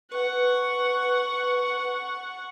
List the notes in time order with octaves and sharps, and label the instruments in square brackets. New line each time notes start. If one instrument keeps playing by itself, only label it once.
[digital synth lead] B4 [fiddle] F#5 C#6